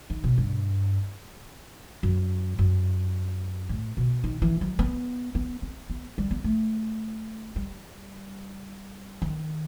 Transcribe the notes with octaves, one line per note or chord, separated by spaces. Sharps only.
D#3
B2
G2
F#2
F#2
A2
B2
D#3
E3
F#3
B3
B3
C4
B3
G3
B3
A3
G3
D#3